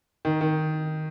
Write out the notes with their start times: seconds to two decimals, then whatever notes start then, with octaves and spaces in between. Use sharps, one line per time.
0.25 D#3
0.41 D#3